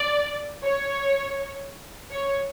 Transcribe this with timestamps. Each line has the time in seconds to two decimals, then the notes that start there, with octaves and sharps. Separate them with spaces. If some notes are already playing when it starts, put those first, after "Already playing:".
Already playing: D5
0.64 C#5
2.11 C#5